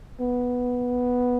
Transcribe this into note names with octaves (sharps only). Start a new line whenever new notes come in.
B3